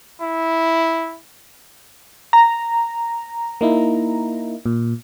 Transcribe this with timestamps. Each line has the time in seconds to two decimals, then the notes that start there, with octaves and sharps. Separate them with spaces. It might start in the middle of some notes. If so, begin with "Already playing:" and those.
0.22 E4
2.33 A#5
3.61 A#3 D#4 E4
4.66 A#2